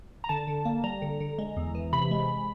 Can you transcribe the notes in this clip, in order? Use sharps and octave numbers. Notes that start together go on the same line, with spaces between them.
A#5
D3 A5
D3
A#3
G3 A#5
D3
D3
G#3
E2
E3
C3 B5
G#3